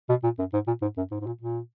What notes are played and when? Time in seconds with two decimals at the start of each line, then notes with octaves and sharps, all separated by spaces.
0.09 B2
0.23 A#2
0.39 F#2
0.53 G#2
0.67 A#2
0.82 G#2
0.97 F#2
1.11 G#2
1.21 G#2
1.26 A#2
1.41 A#2